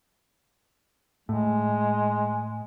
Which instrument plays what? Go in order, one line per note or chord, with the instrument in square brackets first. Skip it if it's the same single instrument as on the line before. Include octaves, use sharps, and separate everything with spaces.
[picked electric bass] A2 [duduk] G#3